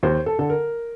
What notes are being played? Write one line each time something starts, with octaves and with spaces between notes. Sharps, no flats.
D#2 C5
A4
D3 A4
A#4